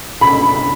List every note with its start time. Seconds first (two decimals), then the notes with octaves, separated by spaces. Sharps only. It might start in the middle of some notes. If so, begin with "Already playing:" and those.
0.21 B5